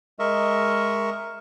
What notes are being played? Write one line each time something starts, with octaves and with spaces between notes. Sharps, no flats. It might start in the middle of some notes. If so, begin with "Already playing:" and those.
G#3 A#4 D#5 E5 C#6